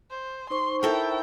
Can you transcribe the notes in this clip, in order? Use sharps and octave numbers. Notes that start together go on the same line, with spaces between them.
C5
D#4 C5 C6 C#6
E4 A4 A#4 G5